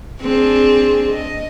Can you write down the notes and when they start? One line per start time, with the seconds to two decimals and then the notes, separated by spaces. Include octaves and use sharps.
0.21 C4 D4 G#4
1.12 D#5